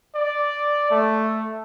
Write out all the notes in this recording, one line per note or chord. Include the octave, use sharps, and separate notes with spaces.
D5
A3